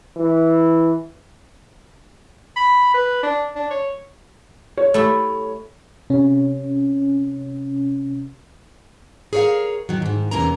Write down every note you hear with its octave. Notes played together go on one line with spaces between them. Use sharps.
E3
B5
B4
D4
D4
C#5
C#5
A3 E4 G4
C3 C#4
G#4 A#4 C#5 D#5 F5
D#3 F#3
G#2 D#3
E2 C3 A#3 C#4 A#4 A#5